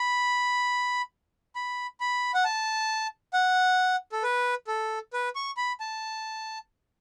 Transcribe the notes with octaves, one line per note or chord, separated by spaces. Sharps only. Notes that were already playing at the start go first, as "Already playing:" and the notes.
Already playing: B5
B5
B5
F#5
A5
F#5
A4
B4
A4
B4
C#6
B5
A5